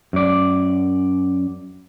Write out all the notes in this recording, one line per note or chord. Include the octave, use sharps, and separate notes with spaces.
F#2 D5